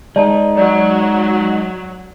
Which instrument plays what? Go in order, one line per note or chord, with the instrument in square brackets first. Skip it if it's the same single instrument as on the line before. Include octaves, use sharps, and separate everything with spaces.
[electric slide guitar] G#3 D#4 [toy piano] D5 A5
[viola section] F#3 [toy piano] D5